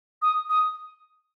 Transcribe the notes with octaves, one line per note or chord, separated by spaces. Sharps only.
D#6
D#6